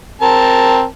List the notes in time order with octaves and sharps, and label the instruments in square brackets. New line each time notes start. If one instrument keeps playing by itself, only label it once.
[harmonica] C4 A#4 A5